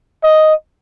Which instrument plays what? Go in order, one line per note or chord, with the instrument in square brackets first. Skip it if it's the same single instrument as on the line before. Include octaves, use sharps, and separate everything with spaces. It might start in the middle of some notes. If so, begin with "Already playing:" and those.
[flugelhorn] D#5